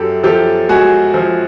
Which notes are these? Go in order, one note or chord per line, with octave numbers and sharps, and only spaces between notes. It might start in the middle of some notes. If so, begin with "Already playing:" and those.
Already playing: F#2 G4 A4
F3 G4 A4
G#3 F#4 G#4
F3